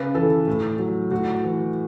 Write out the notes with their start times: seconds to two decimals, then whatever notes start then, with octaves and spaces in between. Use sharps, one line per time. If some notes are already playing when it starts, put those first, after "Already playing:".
Already playing: C#3 B4
0.15 E3 A4
0.47 A2
0.79 F#3
1.11 A2 F#4
1.44 E3